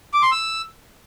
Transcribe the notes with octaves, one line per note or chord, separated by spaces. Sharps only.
D6
C6
E6